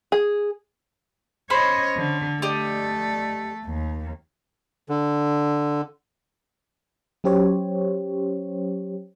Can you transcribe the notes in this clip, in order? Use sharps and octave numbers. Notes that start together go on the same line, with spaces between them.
G#4
C#4 C5 C#5 D#5 B5
D3
A3 G4 A4 D5 D#5
D#2
D3
F#3 C#4 G4 C5 C#5